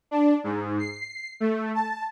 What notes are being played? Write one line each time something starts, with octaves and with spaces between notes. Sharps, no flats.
D4
G#2
C7
A3
A5